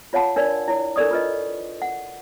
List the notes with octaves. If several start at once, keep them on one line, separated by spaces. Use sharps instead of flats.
F4 C#5 F5 F#5 A5 B5
D4 A#4 C#5 D5
E4 C#5
D4 A4 A#4 D5 C#6 D#6
F4 B4 D#5
F#5